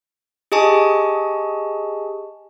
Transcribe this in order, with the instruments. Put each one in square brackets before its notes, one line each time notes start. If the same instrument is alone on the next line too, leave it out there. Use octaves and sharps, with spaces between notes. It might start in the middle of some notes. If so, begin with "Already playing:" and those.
[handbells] G4 G#4 D#5 G#5 A5 C#6